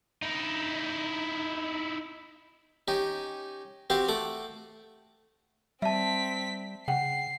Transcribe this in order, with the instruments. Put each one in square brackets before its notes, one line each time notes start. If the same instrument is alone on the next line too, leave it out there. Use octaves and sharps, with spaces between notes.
[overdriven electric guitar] D#4 E4
[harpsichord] C#4 D#4 G4
C4 F#4 G4 C5 F5
A3 F#5 D6
[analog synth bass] G3 [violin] C4 B6 [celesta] E5 A5
[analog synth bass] C#3 [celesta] F#5 G5 [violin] C7